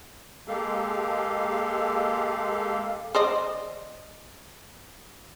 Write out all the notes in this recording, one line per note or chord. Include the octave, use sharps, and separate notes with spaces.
G#3 A#3 G4 A4 F5
C5 D5 D#5